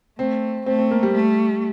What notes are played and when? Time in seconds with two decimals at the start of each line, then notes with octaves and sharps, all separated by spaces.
0.19 A3 C4
0.66 A3 C4
0.79 C4
0.91 A#3
1.03 G3
1.14 A3